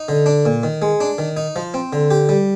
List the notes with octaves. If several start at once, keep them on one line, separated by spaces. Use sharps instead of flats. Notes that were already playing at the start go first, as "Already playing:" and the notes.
Already playing: D#4
D3
D4
A#2
D#3
G#3
D4
D#3
D#4
F3
C4
D3
G4
G3